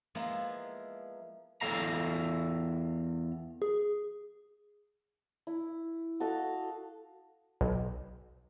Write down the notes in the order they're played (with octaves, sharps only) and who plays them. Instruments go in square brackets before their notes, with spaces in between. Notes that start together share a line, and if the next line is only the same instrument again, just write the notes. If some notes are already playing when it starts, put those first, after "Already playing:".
[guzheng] F3 G#3 A#3 B3 E4
[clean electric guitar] E2 A4 F5 A#5
[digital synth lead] G#4
[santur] E4
F#4 A4 D#5 F5
[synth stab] B1